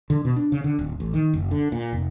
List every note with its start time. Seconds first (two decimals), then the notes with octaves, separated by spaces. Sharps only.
0.10 D3
0.25 B2
0.36 D4
0.52 C#3
0.64 D3
0.79 D1
1.00 A1
1.14 D#3
1.34 F#1
1.51 D3
1.72 A#2
1.92 F1